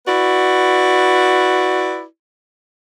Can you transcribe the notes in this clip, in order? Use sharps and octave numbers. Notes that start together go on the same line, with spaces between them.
E4 F#4 B4 D5